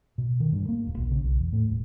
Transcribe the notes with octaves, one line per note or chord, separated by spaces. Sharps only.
B2
D#3
G2
A#3
D#1
A#1
C#3
B1
E2
A2
D#1